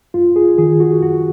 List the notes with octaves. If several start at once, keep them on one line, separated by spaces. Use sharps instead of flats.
F#2 F4
G#4
D#3 G#4
F#4
F#2 F#4